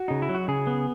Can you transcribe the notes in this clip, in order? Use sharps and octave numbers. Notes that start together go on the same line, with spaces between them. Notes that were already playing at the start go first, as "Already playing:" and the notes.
Already playing: F#4
C#3 D#4
E4
F#3
F#4
C#3 G#4
B3